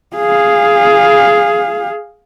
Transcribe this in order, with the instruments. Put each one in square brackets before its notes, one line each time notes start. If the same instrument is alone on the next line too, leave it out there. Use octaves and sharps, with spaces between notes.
[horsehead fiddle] G#4 F5